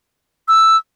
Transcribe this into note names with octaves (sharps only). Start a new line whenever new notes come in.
E6